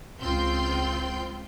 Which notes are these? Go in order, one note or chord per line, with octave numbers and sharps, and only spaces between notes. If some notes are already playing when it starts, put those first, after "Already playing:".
C#2 C4 F4 G5 C6 G6